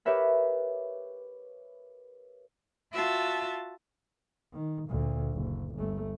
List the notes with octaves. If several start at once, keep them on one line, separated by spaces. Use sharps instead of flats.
G4 A#4 B4 C#5 E5 B5
F4 F#4 E5 A5
D#3
D2 A#2
F#1
G1 A3